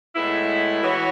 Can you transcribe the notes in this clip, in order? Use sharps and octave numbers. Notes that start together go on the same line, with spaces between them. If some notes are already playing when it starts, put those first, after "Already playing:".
A2 G#3 B3 E4
E3 B3 F#4 C#5